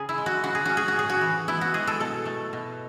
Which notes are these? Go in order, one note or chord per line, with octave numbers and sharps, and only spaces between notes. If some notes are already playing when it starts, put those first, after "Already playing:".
Already playing: C#3 G#4
E4
G#3
F#4
C#3 F#4
G#4
C#4 F#4
G#4
F#4
A2 G#4
F#4
E3
B3 E4
F#4
G#3 G#4
A4
B2 A4
A3
B2